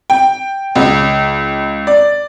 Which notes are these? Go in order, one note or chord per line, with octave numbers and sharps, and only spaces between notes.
G5
C#2
D5